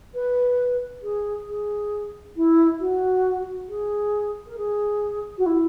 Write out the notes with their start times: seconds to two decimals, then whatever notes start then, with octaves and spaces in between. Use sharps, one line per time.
0.14 B4
1.02 G#4
1.47 G#4
2.36 E4
2.80 F#4
3.69 G#4
4.47 A#4
4.57 G#4
5.38 F#4
5.46 E4